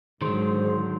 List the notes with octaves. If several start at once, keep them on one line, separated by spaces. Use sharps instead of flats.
G#2 D3 D#3 F#3 G#4 C5